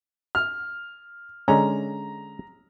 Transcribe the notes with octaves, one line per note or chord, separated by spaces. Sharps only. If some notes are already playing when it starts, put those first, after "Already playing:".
F6
D3 G#3 C#4 A#5